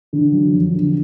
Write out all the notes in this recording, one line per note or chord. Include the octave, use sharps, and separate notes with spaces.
D3
F#3
F2
D3